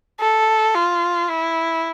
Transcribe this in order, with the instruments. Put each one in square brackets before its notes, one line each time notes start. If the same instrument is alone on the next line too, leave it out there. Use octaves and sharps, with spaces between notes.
[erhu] A4
F4
E4